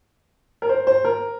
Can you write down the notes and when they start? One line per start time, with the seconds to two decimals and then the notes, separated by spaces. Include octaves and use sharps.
0.62 A#4
0.69 C5
0.87 C5
1.04 A#4